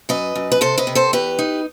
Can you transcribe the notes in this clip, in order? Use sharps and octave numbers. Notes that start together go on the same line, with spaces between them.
F#2 B4 D#5
F#2
B4
C3 A4 C5
B4 D#5
C3
A4 C5
E2 G4 B4
D#4